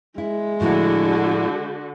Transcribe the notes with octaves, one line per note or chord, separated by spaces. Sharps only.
G#3 E4
A2 D3 F3 E4 F#4